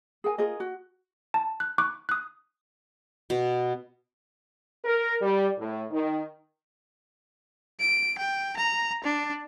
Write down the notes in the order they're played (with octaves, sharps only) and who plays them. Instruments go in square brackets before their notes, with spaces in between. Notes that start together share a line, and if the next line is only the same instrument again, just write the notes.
[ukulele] G#4 A#4 G5 G#5
F4 G#4 A#4 D#5
F#4
[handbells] A5
F#6
C#6 D6 F#6
D#6 F#6
[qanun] B2
[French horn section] A#4
G3
A2
D#3
[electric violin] D7
G5
A#5
D4